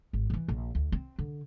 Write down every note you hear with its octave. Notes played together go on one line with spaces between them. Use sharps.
G#1
C#3 E3
A#1
D2
C4
D3